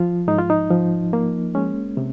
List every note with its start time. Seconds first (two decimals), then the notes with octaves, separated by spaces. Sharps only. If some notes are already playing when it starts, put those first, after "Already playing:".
Already playing: F3 F4
0.28 G#2 D#4
0.38 F4
0.50 D#4
0.71 F3
1.13 A#3
1.55 G#3 C#4
1.97 C3